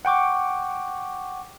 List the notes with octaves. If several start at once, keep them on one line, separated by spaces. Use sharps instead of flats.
F#5 G5 C#6 D6